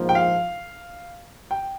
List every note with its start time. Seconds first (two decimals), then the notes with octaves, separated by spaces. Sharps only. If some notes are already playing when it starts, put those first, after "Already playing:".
Already playing: A#1 G#2 F3 A#3
0.09 G5
0.15 F5
1.51 G5